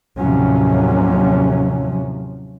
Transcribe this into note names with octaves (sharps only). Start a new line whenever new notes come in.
D#2 A2 C3 F3 F#3 C#4